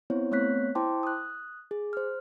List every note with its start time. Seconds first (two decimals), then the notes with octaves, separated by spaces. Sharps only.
0.10 B3 C4 E4 C5 C#5
0.32 A3 B3 C4 C#5 F#6 B6
0.75 E4 C5 G5 A5 C6 D6
1.03 D#6 F#6
1.71 G#4
1.93 C5 F6